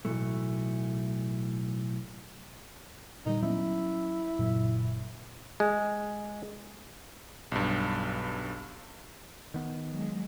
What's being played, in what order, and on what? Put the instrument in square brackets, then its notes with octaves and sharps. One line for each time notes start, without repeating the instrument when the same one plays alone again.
[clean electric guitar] B1 E2 A2 E3 A3
[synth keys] A#2 D3 G3 [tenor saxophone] D#4
[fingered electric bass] F#3 A#3 B3 [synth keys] C#4 [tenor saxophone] E4
[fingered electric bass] F#1 F#3 [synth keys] A#2
[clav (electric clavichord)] G#3
[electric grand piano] B1 G2
[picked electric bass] D#3 B3
[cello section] F#3 G#3